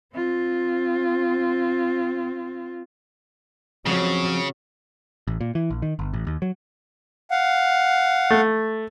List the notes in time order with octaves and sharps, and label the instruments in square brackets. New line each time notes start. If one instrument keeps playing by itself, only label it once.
[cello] C4 F4
[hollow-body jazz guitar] F2 [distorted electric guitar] C#3 [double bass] F#3
[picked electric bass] A1
A#2
E3
A#1
D#3
G1
A1
D#2
F#3
[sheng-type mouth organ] F5 F#5
[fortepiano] A3